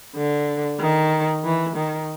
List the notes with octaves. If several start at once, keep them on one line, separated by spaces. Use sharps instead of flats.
D3
D#3
E3
D#3